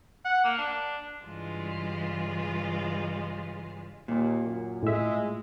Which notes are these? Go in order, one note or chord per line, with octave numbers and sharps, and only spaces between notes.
F#5
A#3
D4
G2 C#3 E3 G3 G#3 F4
D#2 A#2
F#2
A2 G#3 E5